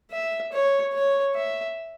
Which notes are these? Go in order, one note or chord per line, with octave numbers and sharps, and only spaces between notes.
E5
C#5
C#5
E5